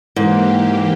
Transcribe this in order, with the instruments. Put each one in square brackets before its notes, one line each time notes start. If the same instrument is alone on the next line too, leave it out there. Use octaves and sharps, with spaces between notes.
[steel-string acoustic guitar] G#2 [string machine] E3 A#3 G4